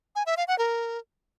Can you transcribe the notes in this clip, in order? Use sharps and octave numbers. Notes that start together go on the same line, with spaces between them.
G#5
E5
F5
F#5
A#4